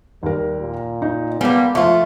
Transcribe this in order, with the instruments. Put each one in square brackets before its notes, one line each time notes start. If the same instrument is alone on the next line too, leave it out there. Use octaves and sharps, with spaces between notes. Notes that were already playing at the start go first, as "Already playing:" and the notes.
[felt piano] D#2 A#4 [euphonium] G3
[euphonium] A#2
[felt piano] D#4
[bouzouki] G3 A#3 [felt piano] G#3 [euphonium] B3
[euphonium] F3 [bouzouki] A3 F4 [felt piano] C#6